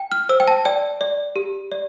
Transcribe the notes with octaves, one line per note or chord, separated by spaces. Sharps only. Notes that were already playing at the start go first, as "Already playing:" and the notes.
Already playing: G5
F6
C5 E6
G5
A5
D5 G5
D5
G4
D5